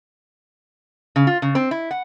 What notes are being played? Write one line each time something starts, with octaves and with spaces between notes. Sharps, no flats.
C#3
F4
C#3
C4
E4
F#5